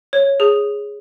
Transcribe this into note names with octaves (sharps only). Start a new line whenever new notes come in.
C#5
G#4